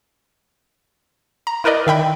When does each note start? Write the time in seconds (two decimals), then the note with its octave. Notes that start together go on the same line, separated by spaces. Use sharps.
1.47 A#5
1.64 E4 A#4 B4 D5 D#5
1.87 D#3 E5 G5 B5